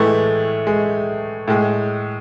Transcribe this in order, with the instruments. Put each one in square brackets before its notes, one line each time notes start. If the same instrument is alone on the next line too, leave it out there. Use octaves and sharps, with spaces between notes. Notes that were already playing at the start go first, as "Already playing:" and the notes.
Already playing: [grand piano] A2 E3 G#3 A3
G#3
A2 G#3